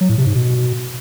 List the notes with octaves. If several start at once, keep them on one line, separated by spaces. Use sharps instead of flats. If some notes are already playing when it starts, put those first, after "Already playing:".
F#3
A2
C3
G#2
B2